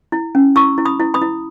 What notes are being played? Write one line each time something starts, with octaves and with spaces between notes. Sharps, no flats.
E4
C#4
E4 C#6 E6
E4
B5 D#6
E4
B5 D#6
E4